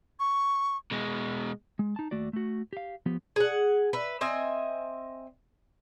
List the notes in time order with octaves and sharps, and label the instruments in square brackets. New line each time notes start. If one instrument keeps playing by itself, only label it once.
[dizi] C#6
[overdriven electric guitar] B2 G#3
[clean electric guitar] G#3
D#4 A5
D#2 A3 F#4 D5
A3 F#4
G4 F5
F3 B3 G4
[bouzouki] G#4 F#5
B4 E5
C4 D#5 E5 G#5